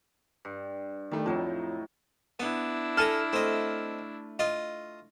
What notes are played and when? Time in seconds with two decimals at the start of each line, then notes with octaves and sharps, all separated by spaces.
0.45 G2
1.11 D#3 G3 A3
1.26 F2 A2 F3 F#3 D#4 A5
2.40 B3 D4 E4
2.97 A4 G#5 A#5 F6
3.33 A3 C4 D#5
4.39 F4 D#5